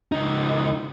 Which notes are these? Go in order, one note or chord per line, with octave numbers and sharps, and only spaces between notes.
C#2 D#4